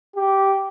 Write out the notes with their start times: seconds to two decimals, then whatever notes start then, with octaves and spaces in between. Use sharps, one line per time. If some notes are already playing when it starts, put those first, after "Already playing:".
0.16 G4